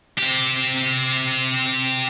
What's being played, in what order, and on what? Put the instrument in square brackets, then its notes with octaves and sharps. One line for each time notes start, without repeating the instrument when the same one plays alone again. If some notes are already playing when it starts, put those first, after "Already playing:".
[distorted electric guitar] C4 G4